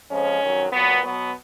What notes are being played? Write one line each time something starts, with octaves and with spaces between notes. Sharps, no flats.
F2 F3 G#3 C#4
F2 D#3 F#3
A#2 F#3 B3
B2 F#3 B3